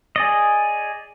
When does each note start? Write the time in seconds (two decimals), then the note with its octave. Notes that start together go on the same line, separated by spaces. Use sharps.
0.16 G#4 D5 D#5